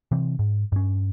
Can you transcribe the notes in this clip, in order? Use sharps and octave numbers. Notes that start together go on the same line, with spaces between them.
C3 E3 C4
G#2
G2 C#4